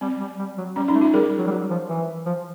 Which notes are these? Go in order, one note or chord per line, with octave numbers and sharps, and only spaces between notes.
G3 C4
G3
G3
F#3
G3 C#4
C#4 D#4
A3
D#4 F4
G3 G#4 A#4
F#3
G3
F#3
F3
E3
F3